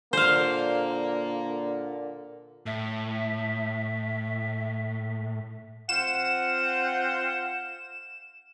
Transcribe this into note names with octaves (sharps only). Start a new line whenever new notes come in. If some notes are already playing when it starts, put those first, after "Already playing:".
A#2 D3 A#3 C5 F5
A2 E5
C4 F4 F#5 E7